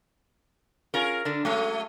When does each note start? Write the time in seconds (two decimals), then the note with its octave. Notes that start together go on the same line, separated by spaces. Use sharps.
0.94 C#4 F4 G#4 A#4
1.25 D3 D4
1.45 F#3 G#3 A3 C#4